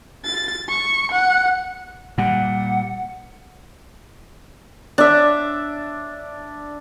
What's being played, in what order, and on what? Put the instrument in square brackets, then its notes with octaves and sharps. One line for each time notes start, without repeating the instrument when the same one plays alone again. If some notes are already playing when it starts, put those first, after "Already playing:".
[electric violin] A6
C#6
F#5
[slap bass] A#2 G3 [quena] F#5
[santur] D4 E5